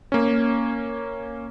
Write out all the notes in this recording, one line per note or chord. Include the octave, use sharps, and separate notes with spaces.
A#3 C#4